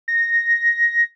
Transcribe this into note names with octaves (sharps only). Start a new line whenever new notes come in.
A#6